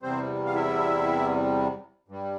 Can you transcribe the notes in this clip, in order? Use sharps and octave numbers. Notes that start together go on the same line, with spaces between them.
E2 C3 G3 C4 C5
F5
E4 E5
G2 G3